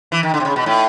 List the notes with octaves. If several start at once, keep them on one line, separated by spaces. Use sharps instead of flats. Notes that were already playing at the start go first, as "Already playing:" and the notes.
E3
D#3
D3
C3
C#3
B2
A2